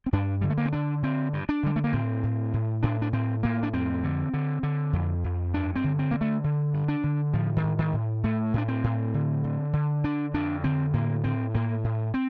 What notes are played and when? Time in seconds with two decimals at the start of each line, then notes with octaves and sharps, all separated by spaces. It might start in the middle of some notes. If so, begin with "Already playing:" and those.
0.06 C4
0.13 G2 D4
0.41 D3 G3
0.50 A3
0.58 A#3
0.65 C4
0.73 D3 D4
1.03 D3 C4
1.33 G2
1.49 D4
1.63 D3 G3
1.76 A3
1.84 A#3
1.93 A2 C4
2.23 A2
2.54 A2
2.83 A2 D4
3.02 D4
3.13 A2 C4
3.43 A2 A#3
3.63 D4
3.74 F2 C4
4.04 D3
4.34 D3
4.63 D3
4.93 F2
5.24 F2
5.54 G2 D4
5.76 C4
5.84 D3
5.99 C4
6.11 D3 A#3
6.21 A3
6.44 D3
6.74 G2
6.88 D4
7.04 D3
7.33 A2 F3
7.56 D#3
7.64 A2
7.79 D#3
7.93 A2
8.24 A2 A3
8.54 A2 D4
8.68 C4
8.84 A2
9.14 D3
9.44 D3
9.73 D3
10.04 D3 D4
10.34 F2 D4
10.64 D3 C4
10.94 A2 A#3
11.24 A2 C4
11.55 A2 A#3
11.84 A2
12.14 C4